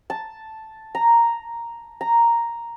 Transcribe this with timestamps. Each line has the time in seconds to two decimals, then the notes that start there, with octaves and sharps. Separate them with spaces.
0.10 A5
0.95 A#5
2.01 A#5